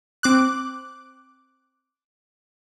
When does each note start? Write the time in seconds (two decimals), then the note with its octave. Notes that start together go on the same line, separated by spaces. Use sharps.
0.23 C4 D6 F#6